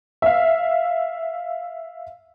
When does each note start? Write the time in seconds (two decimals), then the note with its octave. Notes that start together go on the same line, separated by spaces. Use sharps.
0.22 E5 F5